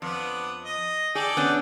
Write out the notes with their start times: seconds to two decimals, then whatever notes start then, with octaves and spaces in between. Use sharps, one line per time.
0.02 F2 B3 D4
0.65 D#5
1.15 G#4 A4 D5 G5
1.37 B3 C#4 D4